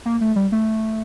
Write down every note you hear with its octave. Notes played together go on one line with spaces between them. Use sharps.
A#3
A3
G3
A3